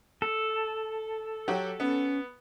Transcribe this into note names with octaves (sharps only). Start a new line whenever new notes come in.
A4
F#3 F#4 G4
B3 C#4